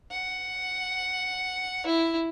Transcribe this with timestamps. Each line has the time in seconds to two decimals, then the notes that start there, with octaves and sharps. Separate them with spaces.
0.11 F#5
1.87 E4